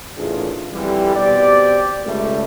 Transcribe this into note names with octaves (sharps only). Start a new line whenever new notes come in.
A1 E2 D#3 D4 F4 G#4
F2 D3 E3 G3
B2 C4 G4 D5
C#2 F#2 G3 A3